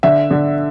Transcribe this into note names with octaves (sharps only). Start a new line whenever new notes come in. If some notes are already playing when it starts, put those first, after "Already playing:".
D3 E5
D3